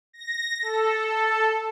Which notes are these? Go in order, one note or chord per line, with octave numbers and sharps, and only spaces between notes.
A#6
A4